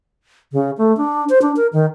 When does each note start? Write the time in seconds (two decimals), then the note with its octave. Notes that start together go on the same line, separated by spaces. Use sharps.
0.53 C#3
0.78 A3
0.97 D4
1.29 C5
1.42 D4
1.56 A#4
1.73 D#3